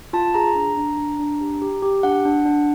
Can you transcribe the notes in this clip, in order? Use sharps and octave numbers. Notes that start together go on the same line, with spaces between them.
F4 A5
G#4 A#5
D4
D4
D4
D4
G4
G4
G4
D4 F#5
D4
D4